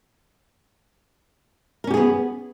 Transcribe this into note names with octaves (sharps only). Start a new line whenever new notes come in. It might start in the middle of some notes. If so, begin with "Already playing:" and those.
B3 C#4 G4 G#4 A#4